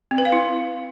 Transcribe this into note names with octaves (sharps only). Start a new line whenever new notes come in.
C4
B4
F5
E4